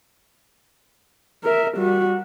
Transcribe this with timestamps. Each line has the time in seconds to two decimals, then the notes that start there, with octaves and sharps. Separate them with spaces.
1.44 A#4 E5
1.77 G3 F#4